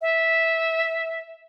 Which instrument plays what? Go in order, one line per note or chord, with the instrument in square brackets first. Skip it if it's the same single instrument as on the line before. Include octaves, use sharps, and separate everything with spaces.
[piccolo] E5